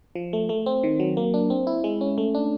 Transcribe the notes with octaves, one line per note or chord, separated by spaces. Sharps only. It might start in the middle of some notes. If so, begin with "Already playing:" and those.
F3
A3
A3
C4
D#3
F#3
A#3
D4
C4
E4
G#3
C#4
A3
D4